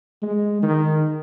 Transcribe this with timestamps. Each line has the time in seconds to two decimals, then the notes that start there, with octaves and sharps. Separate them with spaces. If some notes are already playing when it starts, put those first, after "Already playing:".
0.22 G#3
0.62 D#3